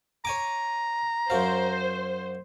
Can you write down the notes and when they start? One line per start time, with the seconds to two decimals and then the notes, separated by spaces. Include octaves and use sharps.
0.25 C#5 G#5 A#5 D6
1.30 F#2 F#4 C5 F5